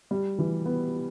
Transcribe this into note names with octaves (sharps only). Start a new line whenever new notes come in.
G3
E3
B3